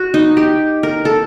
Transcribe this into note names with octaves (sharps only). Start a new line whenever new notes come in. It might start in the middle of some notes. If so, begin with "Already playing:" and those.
Already playing: F#4
D#4
G4
A#4
A4